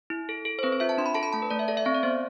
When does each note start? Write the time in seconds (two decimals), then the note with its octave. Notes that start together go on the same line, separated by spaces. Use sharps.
0.10 E4
0.29 A4
0.45 A4
0.59 C5
0.63 C4 B4
0.72 C5
0.80 F4 E5
0.89 A5
0.98 D4 C6
1.06 B5
1.14 A4 A5
1.23 B5
1.32 A3 A5
1.42 B4
1.50 A3 D5
1.59 E5
1.68 A4 D5
1.77 E5
1.85 C4 F5
1.95 D5
2.03 B3 C5